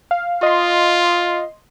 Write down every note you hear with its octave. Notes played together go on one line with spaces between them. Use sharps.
F5
F4 D#5 C6